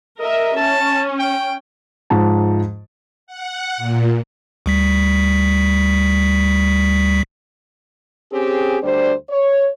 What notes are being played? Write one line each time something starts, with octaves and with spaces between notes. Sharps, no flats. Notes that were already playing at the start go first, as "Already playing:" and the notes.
A#4 D#5 E5
C#4 A5
G5
G#2 F3 A5
F#5
A#2
D2 G3 B6
C4 C#4 G4 G#4
D2 G3 D4 C5
C#5